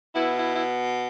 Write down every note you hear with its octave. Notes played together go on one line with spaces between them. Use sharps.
B2 B3 E4
E4
E4